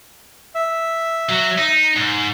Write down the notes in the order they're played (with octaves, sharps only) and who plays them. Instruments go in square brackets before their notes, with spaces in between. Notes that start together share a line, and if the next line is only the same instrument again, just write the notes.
[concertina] E5
[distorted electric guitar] F#3
D#4
G#2